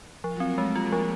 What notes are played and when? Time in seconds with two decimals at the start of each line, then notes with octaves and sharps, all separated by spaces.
0.24 F3
0.31 F4
0.36 F#3 C4 F#4
0.49 A#3 A#4
0.58 G#3 A3 A4
0.75 F4 G4
0.83 G#4
0.90 F3 G3 G4